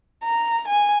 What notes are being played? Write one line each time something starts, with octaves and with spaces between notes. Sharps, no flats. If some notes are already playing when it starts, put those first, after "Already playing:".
A#5
G#5